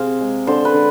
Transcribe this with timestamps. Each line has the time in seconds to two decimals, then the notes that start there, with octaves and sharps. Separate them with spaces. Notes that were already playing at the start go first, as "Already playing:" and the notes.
Already playing: C3 G#4 C5 F5
0.20 G#3
0.47 D3 C5
0.65 B4
0.74 D3